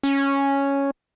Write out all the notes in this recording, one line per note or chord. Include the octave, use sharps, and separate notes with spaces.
C#4